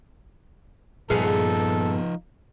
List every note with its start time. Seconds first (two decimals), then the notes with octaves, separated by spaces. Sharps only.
1.10 G2 A#2 F3 B3 D#4 G#4 A4 F5